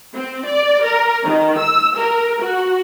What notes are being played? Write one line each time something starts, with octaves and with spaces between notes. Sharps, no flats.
C4
D5
A#4
D#3
E6
A#4
F#4